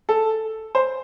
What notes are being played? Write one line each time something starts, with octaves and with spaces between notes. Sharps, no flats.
A4
C5